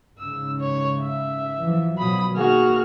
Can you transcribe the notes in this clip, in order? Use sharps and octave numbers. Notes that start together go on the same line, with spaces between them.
G#2 C#3 E6
C#5
E5
E3 F3
B2 F3 F#3 B5 D#6
D#3 A#3 F#4 G#4 F6